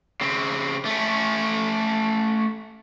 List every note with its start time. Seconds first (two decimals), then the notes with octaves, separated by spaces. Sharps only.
0.21 C#3 C4
0.85 A3 C#4